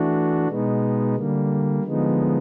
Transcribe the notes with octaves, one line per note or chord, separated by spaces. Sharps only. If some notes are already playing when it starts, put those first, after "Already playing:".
Already playing: E3 A3 D4 F#4
B2 G#3 B3 D#4
D3 G3 A#3
D3 F3 G#3 B3 D#4